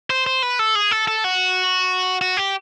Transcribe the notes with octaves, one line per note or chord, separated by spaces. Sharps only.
C5
C5
B4
A4
G#4
A4
A4
F#4
F#4
G4